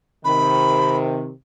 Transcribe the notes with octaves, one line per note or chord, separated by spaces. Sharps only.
C3 D#3 B5